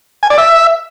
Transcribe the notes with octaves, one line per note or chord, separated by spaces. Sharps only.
G#5
D5
E5